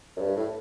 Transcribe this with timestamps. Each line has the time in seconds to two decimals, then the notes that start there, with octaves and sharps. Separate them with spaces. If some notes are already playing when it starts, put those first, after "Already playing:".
0.17 F#2
0.21 G2
0.36 A2